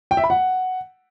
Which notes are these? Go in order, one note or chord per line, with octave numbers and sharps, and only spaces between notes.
G5
E5
B5
F#5